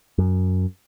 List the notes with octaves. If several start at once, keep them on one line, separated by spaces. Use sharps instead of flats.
F#2